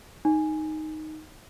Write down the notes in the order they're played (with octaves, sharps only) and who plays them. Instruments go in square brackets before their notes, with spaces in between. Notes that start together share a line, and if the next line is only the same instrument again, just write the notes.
[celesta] D#4